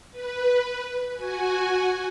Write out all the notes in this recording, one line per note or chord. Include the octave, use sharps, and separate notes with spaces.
B4
F#4 G#5